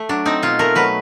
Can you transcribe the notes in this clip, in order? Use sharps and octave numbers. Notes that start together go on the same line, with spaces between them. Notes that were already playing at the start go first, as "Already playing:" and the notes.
Already playing: A3
F#3 D4
C4 D#4
B2 F4
A3 A#4
F#3 B4